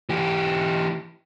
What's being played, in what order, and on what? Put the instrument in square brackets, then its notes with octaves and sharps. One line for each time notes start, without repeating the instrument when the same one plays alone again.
[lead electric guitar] E3 G4